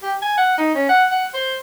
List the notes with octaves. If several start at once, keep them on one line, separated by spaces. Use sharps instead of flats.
G4
G#5
F#5
D#4
C#4
F#5
F#5
C5